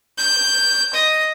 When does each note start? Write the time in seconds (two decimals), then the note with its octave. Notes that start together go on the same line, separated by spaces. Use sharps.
0.18 G6
0.94 D#5